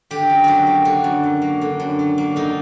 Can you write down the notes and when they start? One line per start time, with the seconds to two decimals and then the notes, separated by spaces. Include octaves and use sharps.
0.11 D3 G4
0.30 F#2
0.44 F#3 F#4 G4
0.67 A#3
0.85 D3 F#4
1.04 F#2
1.23 F#3
1.42 A#3
1.61 D3
1.80 F#2
1.99 F#3
2.18 A#3
2.36 D3 D#4